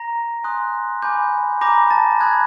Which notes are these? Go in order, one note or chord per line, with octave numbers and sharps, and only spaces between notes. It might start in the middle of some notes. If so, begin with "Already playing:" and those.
Already playing: A#5 A#6
G#5 C6 D#6 F#6
G#5 B5 D6 G6
G#5 A#5 B5 D6 G6 A#6
A5 A6
B5 D#6 F#6 G#6